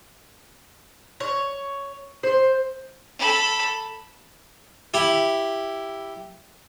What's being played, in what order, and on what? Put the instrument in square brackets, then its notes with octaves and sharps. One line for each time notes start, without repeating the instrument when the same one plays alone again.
[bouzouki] C#5
C5
[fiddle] A4 B5
[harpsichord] E4 G4